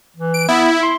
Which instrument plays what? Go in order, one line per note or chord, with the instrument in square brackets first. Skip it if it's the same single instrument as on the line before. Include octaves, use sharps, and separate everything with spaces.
[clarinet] E3
[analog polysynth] D7
[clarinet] B3 [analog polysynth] E4
[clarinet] C6